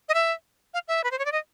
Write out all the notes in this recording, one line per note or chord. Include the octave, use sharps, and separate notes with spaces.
D#5
E5
F5
E5
B4
C5
C#5
D5
D#5